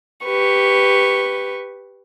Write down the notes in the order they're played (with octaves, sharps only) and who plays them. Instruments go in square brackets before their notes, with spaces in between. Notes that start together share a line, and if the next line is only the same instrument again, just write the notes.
[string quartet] G4 B4 C#6